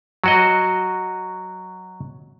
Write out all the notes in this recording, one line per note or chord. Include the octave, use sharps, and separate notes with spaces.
F#3 F#4 D#5